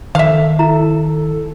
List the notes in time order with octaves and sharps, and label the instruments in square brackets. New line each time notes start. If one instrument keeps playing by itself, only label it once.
[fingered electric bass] D#3 [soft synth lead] A4 [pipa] E5 F5
[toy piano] E4 A#5